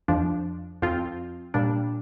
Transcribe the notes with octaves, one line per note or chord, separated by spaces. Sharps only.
F2 F3 D4
F2 F3 C4 F4
A#2 G3 D4